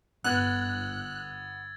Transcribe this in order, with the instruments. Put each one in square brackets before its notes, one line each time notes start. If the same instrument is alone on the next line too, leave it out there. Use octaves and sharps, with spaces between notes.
[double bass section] G1 [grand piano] B3 [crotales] E6 G#6 A6 [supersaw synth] F#6